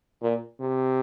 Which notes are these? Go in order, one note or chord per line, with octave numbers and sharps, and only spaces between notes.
A#2
C3